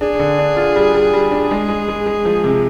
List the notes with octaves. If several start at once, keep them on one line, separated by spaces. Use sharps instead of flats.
D4 G#4
D3
D4
F4
G3
G3
G3
D4
G#3
G#3
G#3
G#3
F3
C3